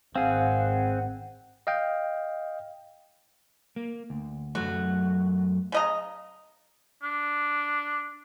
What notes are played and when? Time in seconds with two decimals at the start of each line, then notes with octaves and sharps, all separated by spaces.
0.15 G#1 C4 G#4 F5 F#5
1.67 D#5 F5 G5
3.76 A#3
4.10 D2
4.55 F#2 F#3 A3 F#4
5.72 C#3 D#5 A#5
7.03 D4